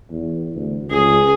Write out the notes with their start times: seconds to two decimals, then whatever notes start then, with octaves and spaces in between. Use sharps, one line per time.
0.10 E2
0.55 D2
0.90 C#2 G#4